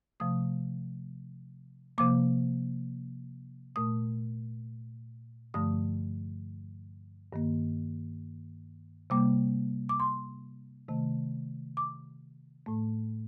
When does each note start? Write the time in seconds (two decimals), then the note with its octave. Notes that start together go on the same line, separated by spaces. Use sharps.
0.20 C3 F3 A3 D#6
1.98 C3 F3 A#3 D6
3.76 A#2 A3 D#6
5.54 G2 D3 F3 A3 D#6
7.33 G2 D#3 A#3
9.10 C3 G3 A#3 D6
9.89 D6
10.00 C6
10.88 C3 D#3 A3
11.77 D6
12.66 A2 A3